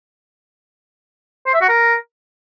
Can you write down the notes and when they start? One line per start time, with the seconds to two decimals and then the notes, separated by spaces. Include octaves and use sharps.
1.46 C5
1.54 E5
1.61 F#4
1.69 A#4